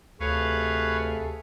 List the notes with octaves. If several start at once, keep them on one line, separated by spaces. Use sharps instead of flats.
D2 C3 G#4 A4 B4 C#5 F5